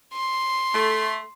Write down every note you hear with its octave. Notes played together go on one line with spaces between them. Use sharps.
C6
A3